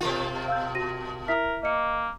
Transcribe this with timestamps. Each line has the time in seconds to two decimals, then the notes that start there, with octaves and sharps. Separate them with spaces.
0.01 B2 A#3 F4
0.48 F5 E6 G6
0.75 F#4 A#6 D#7
1.28 E4 A#4 E5 B6
1.63 A#3 D#5 C#7